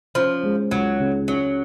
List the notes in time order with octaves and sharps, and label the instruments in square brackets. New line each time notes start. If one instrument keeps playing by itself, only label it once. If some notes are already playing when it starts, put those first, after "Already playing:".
[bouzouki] F3 [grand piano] C#4
[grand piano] G#3
[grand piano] C#2 [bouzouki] F#3
[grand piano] C#3
[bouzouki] F#3 [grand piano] C#4